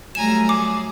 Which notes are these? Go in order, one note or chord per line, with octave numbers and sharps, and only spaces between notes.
F#3 G3 A3 G#5 A#5 E7
G#4 D6